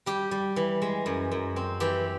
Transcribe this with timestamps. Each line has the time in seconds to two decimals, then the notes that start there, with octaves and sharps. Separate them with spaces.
0.06 G3 G4
0.31 G3
0.56 E3
0.82 G#3
1.06 F#2
1.31 F#2
1.56 C4
1.80 E3 G4